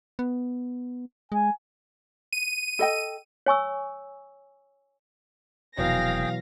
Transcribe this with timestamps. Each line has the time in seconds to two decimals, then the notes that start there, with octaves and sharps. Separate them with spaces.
0.19 B3
1.32 G#3 G#5
2.33 D#7
2.79 A4 D#5 G5
3.46 C#5 G#5 C#6 E6
5.78 F1 B2 E3 F#3 G#4 F5 G5 A#6